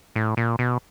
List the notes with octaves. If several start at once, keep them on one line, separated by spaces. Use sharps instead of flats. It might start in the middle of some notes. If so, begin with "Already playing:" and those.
A2
A#2
B2